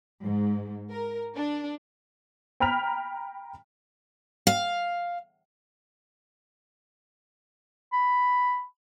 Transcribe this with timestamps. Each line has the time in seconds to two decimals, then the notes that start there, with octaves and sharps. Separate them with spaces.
0.23 G#2
0.90 A#4
1.36 D4
2.60 G5 A#5 B5 F6 B6 F7
4.47 F5
7.93 B5